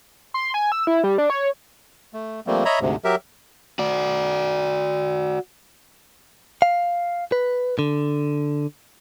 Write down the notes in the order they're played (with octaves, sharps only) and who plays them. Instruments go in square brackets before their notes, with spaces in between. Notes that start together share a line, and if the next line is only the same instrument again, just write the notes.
[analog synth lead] C6
G#5
E6
E4
G3
D4
C#5
[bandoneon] A3
F3 G3 A3 A#3 C4
C#5 D#5 E5 A#5 B5
D2 G#2 C3
F#3 G4 A#4 E5
[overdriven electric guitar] F#4 D5
[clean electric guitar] F5
B4
D3